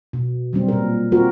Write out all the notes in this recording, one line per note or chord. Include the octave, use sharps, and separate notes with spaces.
B2
F#3 G3 C4
A#2 A#4
C4 F4 F#4 A#4